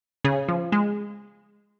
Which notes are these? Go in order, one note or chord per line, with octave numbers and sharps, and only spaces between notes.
C#3 G#4
F3
G#3